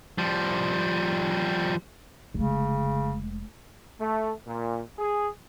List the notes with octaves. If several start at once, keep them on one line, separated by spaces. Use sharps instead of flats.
F3 G3
F1 C#3 G#3
A3
A#2
G#4